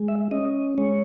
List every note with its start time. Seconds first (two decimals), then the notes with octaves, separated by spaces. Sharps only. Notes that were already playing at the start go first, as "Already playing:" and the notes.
Already playing: G#3
0.08 E5
0.31 C#4 D#5
0.78 G#3 C#5